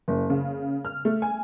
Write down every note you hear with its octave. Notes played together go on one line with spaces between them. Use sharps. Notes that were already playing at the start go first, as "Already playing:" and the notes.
F#1
C#3
F6
A3
G#5